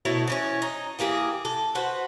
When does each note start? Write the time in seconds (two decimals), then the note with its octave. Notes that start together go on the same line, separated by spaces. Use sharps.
0.05 B2 A3 E4 C#5
0.28 E3 C#4 C#5
0.62 D#4
0.99 E3 A#3 G4 G#4
1.45 A4
1.75 F#4 B4 C5